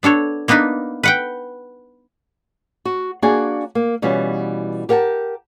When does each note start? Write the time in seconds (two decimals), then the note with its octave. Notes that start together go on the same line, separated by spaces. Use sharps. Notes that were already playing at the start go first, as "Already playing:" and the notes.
0.03 B3 D4 A4 C#5
0.48 A#3 B3 D4 D#4 B4
1.03 B4 F#5 G5
2.85 F#4
3.22 A#3 D4 F#4 G#4 D5 G#5
3.75 A#3
4.02 B2 E3 G3 B3 C#4 F4
4.89 G4 A#4 F#5 G5 A5